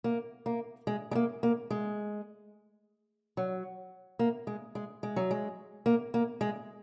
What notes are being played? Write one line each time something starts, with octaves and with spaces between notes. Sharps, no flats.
A#3
A#3
G#3
G#3
A#3
A#3
G#3
F#3
A#3
G#3
G#3
G#3
F#3
G#3
A#3
A#3
G#3